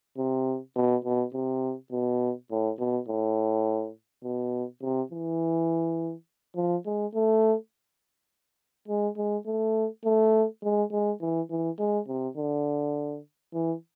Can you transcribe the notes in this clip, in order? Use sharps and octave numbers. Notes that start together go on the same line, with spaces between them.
C3
B2
B2
C3
B2
A2
B2
A2
B2
C3
E3
F3
G#3
A3
G#3
G#3
A3
A3
G#3
G#3
E3
E3
G#3
C3
D3
E3